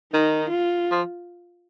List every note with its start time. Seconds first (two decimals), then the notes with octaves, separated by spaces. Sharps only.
0.13 D#3 D#4
0.50 F4
0.91 F3